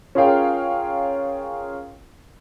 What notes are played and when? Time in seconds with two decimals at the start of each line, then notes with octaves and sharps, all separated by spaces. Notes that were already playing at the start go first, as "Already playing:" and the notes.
0.15 C#4 F4 G#4 A#4 F5 G5